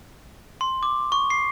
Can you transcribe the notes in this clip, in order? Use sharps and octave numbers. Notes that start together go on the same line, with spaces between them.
C6
D6
C#6
C7